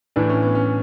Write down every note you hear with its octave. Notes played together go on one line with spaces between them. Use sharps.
A2 E3 D4
C#4
B3
C#4